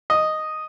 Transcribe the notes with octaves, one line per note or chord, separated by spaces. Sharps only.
D#5